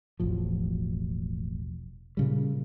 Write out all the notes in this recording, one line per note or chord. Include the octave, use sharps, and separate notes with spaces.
E1 A1 F3
A#2 C#3 G3